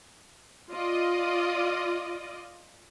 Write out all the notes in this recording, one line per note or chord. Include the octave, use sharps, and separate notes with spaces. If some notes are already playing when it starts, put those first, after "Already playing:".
F4 D5 D#5